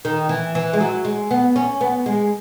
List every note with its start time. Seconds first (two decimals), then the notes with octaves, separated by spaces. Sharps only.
0.05 D#3
0.29 E3
0.55 E3
0.73 G#3
0.81 F#3
1.05 G#3
1.31 B3
1.56 C#4
1.81 B3
2.06 G#3